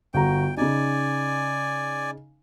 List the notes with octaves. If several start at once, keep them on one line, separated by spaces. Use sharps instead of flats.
G1 F#4 G5 A#5
C#3 D#4 D5 G#5